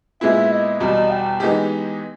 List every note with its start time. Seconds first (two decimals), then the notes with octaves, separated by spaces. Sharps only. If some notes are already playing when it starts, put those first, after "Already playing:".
0.21 A#2 G#3 B3 E4 E5
0.51 D#5
0.80 E2 B2 G3 D#5
1.10 G5
1.40 E3 G#3 B3 D#4 G4